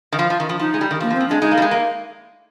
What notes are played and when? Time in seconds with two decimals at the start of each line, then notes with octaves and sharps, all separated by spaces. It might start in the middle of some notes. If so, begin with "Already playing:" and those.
0.12 D#3
0.19 F3
0.30 F3
0.40 D#3
0.49 F3
0.59 F3 D#4
0.74 G#3
0.81 G3
0.91 D#3
1.00 F3 A#3
1.10 F3
1.15 C4
1.20 F3
1.28 G#3 D4
1.41 G#3 D#4
1.51 A#3
1.57 G3
1.62 G#3
1.71 A#3